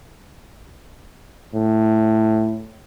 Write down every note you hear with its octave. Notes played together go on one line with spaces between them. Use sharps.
A2